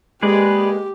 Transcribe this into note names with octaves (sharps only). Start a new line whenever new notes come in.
G#3 A#3 G4 G#4 B4 D5